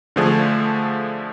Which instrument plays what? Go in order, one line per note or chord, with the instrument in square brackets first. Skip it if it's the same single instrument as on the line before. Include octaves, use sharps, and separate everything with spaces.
[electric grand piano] D3 F3 A3 D4 G#4